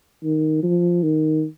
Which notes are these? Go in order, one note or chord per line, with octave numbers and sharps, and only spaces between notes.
D#3
F3
D#3